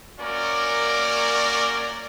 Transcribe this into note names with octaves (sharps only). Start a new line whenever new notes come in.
A#3 C#4 F#4 A#4 D5